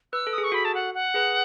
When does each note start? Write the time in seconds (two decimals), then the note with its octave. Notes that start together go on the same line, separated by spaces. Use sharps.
0.13 B4 E6
0.27 A4
0.33 G#4 D#6
0.44 C#6
0.52 F#4 A4 B5
0.65 A5
0.75 F#5
0.94 F#5
1.14 G#4 B4